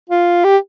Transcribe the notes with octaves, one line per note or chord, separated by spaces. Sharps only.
F4
G4